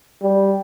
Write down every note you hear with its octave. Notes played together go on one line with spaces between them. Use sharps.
G3